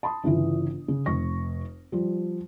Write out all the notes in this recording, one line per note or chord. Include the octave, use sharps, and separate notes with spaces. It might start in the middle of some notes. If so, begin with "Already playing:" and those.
A5 B5 C6 D#6
G1 C#3 E3 F4
C#3
F1 C#6 A#6
F3 G3